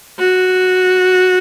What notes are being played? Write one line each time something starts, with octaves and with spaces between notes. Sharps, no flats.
F#4